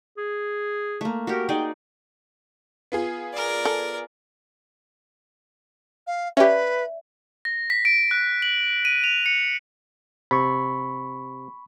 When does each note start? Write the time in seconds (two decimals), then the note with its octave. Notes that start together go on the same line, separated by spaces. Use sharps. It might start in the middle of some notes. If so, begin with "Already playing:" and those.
0.17 G#4
1.01 A3 A#3
1.27 F#4 G4 A#4
1.49 D#4 G#4 D5 G5
2.92 B3 F4 G#4
3.33 A#4 D5
3.65 A4
6.07 F5
6.37 C#4 G4 B4 D5 E5
7.45 A#6
7.70 B6
7.85 D7
8.11 F#6
8.42 F#7
8.85 D#7
9.04 F7
9.26 C#7
10.31 C3 B5 C#6